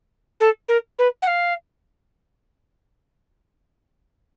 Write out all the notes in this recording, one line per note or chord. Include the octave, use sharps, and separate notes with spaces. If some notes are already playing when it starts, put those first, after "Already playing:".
A4
A#4
B4
F#5
F5